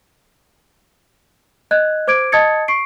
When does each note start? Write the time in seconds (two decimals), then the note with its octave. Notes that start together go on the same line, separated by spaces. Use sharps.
1.71 D#5 F#6 G#6
2.08 C5 D6 G#6 D7
2.32 D#5 A5 D#6 G#6 A6 C#7
2.68 C#6 C7 D7